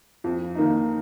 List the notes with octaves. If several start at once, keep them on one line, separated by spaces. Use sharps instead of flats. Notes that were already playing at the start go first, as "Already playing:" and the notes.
F2
D#3 A#3 D#4